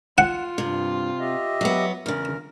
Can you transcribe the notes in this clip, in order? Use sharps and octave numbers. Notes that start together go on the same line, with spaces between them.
F4 F#5
G2 C3
G4 D#5 E5
F#3 B3
E2 C#3 A#4